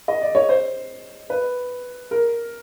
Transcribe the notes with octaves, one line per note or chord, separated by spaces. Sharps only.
D#5
D5
C#5
C5
B4
A#4